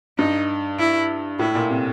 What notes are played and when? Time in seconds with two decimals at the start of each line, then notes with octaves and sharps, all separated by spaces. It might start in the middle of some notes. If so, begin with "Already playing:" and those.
0.18 G2 D#4
0.79 E4
1.39 A2 E4
1.55 A#2
1.70 C3